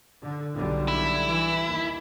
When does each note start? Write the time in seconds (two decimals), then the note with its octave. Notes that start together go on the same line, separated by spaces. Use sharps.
0.21 D3
0.53 B1 D3 G3
0.88 E4
1.28 E3
1.62 D#2